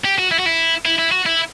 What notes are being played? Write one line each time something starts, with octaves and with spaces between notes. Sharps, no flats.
G4
F#4
E4
F#4
E4
E4
E4
F#4
E4